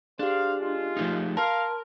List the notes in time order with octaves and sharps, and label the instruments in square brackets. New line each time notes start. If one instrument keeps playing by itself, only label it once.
[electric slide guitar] D4 [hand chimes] G4 G#4 [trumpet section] C5 F5
[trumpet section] G#3 F4
[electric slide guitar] F3 A3 D#4
[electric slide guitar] A#4 [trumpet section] F5 [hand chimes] A5 C6 F6